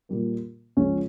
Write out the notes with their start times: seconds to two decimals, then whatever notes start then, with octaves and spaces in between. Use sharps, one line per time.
0.09 A#2 G3 A#3
0.77 C#2 C#3 F3 G#3 C#4